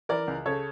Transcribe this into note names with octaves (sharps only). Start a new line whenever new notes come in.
E3 A#4 D5
C#2
C#3 A4 C#5